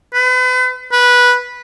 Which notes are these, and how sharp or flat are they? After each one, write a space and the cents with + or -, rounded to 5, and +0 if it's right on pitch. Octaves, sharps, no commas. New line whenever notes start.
B4 +40
B4 -10